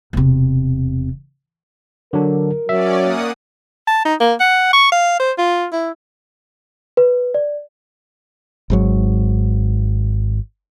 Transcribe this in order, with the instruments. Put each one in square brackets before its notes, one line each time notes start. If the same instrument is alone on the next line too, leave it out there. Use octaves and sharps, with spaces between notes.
[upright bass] E1 C3
[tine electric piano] D3 F#3 D4 [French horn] A#4
[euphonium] F#3 [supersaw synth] C#4 D5 [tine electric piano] E5
[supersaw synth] A#3 F#5 D#6
[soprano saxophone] A5
D#4
A#3
F#5
C#6
F5
C5
F4
E4
[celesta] B4
D5
[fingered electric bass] G#1 G#2 F#3